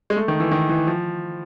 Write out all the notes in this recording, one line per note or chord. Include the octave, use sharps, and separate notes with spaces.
G#3
A3
D#3
E3
D#3
E3
F3